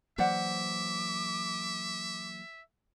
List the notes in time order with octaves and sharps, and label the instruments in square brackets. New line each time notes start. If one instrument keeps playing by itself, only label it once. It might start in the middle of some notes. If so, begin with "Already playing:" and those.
[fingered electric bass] E3 F#3 A#3 [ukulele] C5 D5 F#5 [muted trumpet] E5 [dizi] D6